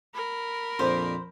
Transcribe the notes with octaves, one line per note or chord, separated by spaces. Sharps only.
A#4 B5
F2 A#2 D4 C5